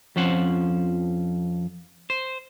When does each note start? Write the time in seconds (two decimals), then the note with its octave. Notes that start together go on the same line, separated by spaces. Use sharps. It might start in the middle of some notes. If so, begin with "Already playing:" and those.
0.16 F2 F3 C#4 C5 F#5
2.10 C5